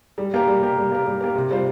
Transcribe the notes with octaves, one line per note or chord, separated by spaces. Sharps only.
G3
A#3 G4 A#4
G3
A#3 G4 A#4
G3
A#3 G4 A#4
G3
A#3 G4 A#4
C3
G3 C4 F4 C5